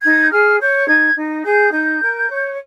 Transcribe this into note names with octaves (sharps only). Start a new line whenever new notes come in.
D#4 G#6
G6
G#4 F6
C#5 G6
D#4 G#6
D#4
G#4 G6
D#4 G6
A#4
C#5